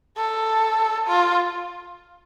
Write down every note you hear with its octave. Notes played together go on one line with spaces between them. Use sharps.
A4
F4